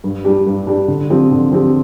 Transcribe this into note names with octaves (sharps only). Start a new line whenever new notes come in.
G2
G3 D4 G4
G2
G3 D4 G4
D3
F3 C4 G4
D3
F3 C4 G4